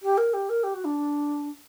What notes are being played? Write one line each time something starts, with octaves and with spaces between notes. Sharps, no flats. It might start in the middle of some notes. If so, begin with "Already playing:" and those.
G4
A#4
G4
A#4
G4
F#4
D4